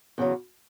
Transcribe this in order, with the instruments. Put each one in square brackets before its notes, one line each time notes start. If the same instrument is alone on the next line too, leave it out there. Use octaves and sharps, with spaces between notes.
[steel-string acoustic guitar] E2 C#3 F#3